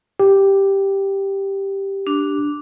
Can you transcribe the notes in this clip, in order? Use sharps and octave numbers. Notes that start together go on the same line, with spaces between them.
G4
D4